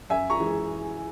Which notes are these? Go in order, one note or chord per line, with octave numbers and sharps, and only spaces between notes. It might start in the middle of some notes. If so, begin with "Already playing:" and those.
F#2 E5 G#5
A#5 C#6
E3 G#3